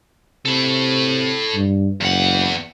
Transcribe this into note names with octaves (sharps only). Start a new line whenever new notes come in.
C3 E4 A4
G2
F#1 E2 F#5